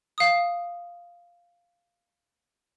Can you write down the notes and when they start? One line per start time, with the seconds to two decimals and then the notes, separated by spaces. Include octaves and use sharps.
0.18 F5 D#6